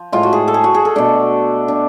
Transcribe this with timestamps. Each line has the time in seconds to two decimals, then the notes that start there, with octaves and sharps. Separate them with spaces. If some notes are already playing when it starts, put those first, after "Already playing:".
Already playing: F3
0.12 A2 G#3 F4
0.23 F#4
0.33 G#4
0.48 A4
0.54 G#4
0.64 F#4
0.74 G#4
0.85 A4
0.95 B2 A3 D4
1.68 D4